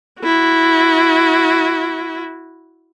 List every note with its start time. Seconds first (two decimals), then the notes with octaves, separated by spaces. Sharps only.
0.22 E4 F#4